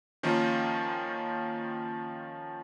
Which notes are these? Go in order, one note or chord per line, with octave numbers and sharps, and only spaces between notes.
D#3 F3 A#3 C#4 F4